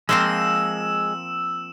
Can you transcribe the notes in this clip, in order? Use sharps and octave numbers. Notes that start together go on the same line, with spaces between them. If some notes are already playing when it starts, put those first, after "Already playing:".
F3 G#3 A#3 C4 E6 E7